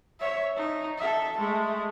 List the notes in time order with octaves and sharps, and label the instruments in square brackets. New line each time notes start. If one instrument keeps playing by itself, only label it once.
[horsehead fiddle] C#5 E5
D#4
A4 E5
G#3 A3